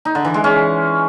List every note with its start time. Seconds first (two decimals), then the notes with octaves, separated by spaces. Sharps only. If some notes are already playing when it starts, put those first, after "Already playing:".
0.05 D#4
0.15 D3
0.25 E3
0.34 G#3
0.44 C#4